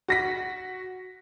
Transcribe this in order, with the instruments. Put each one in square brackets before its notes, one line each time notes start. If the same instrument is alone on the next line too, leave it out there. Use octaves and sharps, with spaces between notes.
[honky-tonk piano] F#4 A#6 B6